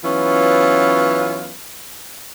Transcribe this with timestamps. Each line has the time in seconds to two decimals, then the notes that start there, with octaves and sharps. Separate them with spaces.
0.05 E3 F#3 B3 C#4 F4